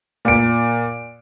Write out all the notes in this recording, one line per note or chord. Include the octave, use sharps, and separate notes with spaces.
A#2 D7